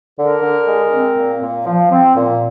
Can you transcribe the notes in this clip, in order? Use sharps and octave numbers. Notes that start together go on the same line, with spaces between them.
D3 A#4
D3
G#3
C4
A#2
A#2
F3
C4
A#2